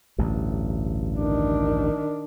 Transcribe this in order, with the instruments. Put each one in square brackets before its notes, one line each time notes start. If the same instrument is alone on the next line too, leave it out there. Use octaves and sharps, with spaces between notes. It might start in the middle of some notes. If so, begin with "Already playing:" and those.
[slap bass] A1 D2 G2
[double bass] D#3 D4